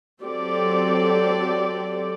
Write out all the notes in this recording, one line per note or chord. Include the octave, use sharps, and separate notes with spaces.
F#3 C4 G4 A4 D5